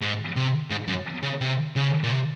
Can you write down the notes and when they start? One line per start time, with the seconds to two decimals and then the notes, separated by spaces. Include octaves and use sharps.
0.01 G#2
0.36 C3
0.71 G#2
0.88 F#2
1.23 C#3
1.41 C3
1.76 C#3
2.03 A#2
2.11 C3